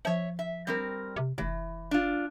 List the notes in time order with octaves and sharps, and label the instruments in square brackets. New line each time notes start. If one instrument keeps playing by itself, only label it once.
[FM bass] F3 [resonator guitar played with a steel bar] C#5 E5
[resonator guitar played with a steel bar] E5
G3 C4 A#4
[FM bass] C3
[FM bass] F1 [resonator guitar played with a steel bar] E3
[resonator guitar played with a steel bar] D4 F4